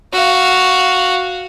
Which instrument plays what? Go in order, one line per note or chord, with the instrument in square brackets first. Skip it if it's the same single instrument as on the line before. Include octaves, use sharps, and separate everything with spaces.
[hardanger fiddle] F#4 F5